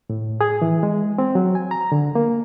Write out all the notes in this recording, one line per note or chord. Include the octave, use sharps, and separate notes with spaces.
A2
G#4
E3
G#3
C4
F#3
G#5
A#5
D3
A#3